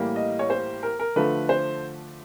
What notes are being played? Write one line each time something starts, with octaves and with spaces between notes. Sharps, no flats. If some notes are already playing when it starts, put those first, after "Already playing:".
Already playing: A2 E3 G3 A#3
D#5
C#5
C5
A#4
A#4
D3 F3 A3 B4
C5